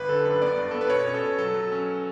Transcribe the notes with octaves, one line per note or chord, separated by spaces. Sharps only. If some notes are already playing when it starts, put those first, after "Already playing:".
Already playing: G1 B4
D3 A4
F#2 B4
B3 D5
G2
B3 A4
B4
B2 C#5
C#4
A4
B2
F#3 A4
F#3
C#4